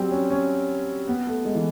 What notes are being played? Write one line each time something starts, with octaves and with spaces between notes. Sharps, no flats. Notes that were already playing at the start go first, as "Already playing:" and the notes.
Already playing: F#3 G3 C4
C#4
C#4
B3
A3
G#3
E3